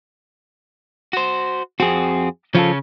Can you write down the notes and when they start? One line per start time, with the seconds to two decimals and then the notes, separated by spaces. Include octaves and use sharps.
1.13 F#4 C5
1.80 F2 C4 F#4 G#4
2.55 C#3 F3 C#4 F4 A4